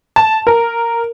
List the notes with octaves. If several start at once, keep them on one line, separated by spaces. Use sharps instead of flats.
A5
A#4